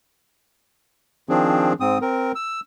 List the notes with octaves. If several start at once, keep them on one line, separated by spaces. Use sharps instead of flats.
D#3 F3 C4 D4 G#4
G#2 C4 D#6
C4 A#4
E6